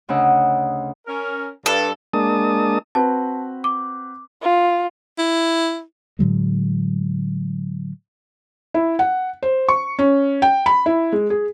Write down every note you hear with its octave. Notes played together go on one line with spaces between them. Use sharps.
D2 C#3 D4 D#5 F#5 E6
C#4 A#4
G2 A4
G#3 A#3 D4 A5 D#6
C4 F#4 B4 A5
D6
F4
E4
A2 D3 F#3 G#3
E4
F#5
C5
C#6
C#4
G5
B5
E4
G#3
G#4